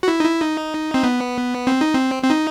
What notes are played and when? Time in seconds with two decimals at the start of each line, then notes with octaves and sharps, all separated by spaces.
0.03 F#4
0.08 E4
0.20 D#4
0.24 E4
0.40 D#4
0.94 C4
1.03 B3
1.67 C4
1.81 D#4
1.94 C4
2.23 C4
2.30 D#4